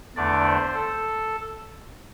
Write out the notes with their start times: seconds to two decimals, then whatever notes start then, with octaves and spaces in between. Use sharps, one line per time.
0.15 E2 D3 A3 D4 D5
0.45 C5
0.74 A4